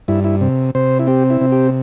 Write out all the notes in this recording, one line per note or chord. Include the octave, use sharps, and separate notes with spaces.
G2 E4
E4
C3
C3 C5
E4
C4 G4
E4
C3
G4